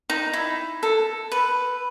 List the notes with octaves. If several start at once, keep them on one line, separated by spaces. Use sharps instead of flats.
D#4
E4
A4
B4